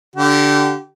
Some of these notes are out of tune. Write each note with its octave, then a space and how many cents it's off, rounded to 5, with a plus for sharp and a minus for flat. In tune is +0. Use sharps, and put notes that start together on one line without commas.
D3 -10 G4 -30